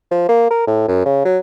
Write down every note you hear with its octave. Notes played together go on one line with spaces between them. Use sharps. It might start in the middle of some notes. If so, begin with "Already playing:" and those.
F3
A#3
A#4
A2
F#2
C#3
F#3